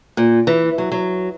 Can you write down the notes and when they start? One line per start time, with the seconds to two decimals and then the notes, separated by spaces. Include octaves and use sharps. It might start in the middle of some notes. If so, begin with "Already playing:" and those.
0.17 A#2
0.47 E3
0.78 F#3
0.92 F#3